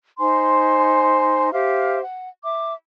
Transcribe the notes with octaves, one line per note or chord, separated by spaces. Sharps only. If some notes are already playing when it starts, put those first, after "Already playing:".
D#4 C5 G#5 C6
G4 C5 E5 F5
F#5
E5 D6